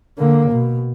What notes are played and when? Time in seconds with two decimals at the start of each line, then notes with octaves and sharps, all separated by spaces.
0.18 D3 A#3
0.52 B2